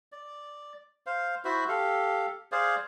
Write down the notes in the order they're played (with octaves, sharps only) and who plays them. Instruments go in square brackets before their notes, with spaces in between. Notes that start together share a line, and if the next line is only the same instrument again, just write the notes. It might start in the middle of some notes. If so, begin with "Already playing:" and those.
[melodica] D5
C5 F5
E4 F#4 C5 E5
G4 A4 F5
G#4 C5 D5 F5